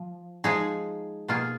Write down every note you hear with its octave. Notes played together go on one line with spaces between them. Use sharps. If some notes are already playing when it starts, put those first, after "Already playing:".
Already playing: F3
F3 G#3 D#4 G#4
B2 A#3 F4 G#4